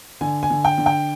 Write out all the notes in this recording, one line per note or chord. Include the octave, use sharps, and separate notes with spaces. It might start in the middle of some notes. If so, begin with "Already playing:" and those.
D3 G#5
G#5
D3
G5
D3
G5